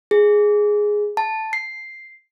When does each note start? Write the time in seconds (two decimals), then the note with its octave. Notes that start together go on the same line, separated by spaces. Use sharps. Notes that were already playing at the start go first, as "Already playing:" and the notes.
0.11 G#4
1.17 A5
1.53 C7